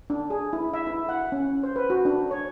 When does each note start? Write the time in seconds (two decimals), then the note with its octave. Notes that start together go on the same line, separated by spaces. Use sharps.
0.10 D4
0.30 G#4
0.53 E4
0.74 E5
0.87 E4
1.09 F#5
1.32 C#4
1.63 C5
1.76 B4
1.90 F#4
2.05 D4
2.31 C#5